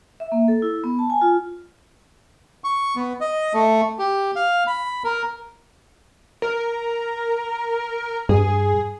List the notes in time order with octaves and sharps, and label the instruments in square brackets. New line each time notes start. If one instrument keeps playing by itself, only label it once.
[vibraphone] E5
A#3
A4
E4
B3
A5
G#5
F4
[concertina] C#6
B3
D#5
A3
G4
F5
B5
A#4
[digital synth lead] A#4
[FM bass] G2 [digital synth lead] G#4